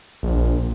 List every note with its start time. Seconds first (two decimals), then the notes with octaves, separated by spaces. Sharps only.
0.23 A#1